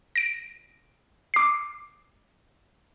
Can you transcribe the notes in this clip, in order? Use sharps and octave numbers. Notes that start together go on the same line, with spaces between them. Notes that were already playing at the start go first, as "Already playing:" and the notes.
A#6 D7
D6 C7